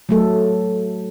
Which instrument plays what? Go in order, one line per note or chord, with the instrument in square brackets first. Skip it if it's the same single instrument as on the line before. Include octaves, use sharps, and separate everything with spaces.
[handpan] F#3 A3 A4